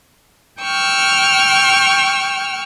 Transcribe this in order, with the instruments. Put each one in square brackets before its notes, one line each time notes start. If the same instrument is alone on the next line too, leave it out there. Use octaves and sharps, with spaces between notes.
[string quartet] G5 C#6 E6 F6